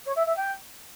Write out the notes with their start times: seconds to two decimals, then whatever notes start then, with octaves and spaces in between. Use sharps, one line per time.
0.06 C#5
0.16 E5
0.26 E5
0.36 G5